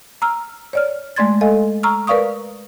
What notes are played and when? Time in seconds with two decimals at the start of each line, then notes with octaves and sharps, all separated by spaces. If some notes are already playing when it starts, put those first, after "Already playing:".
0.22 A#5 E6 F6
0.73 C#5 D5 F6
1.16 G#3 A3 D5 C6 G#6 A6
1.41 A4 D#5 F5 G#5
1.83 A#5 C#6 E6 F6
2.07 A#4 B4 D5 F5 C#6 D#6